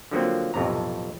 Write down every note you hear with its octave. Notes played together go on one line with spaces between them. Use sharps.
D3 F3 F#3 A#3 C4
B1 F2 A2 C3 A#5